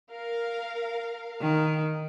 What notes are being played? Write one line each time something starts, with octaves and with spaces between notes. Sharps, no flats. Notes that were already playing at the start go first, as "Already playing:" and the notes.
A#4 F5
D#3